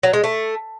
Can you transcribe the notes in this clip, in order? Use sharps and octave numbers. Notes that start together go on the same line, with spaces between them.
F#3
G#3
A3